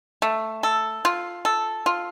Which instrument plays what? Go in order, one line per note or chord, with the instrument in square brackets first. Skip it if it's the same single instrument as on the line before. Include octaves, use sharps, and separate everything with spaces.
[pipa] A3
A4
F4
A4
F4